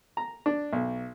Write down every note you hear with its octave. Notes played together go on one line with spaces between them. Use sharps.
A#5
D4
B1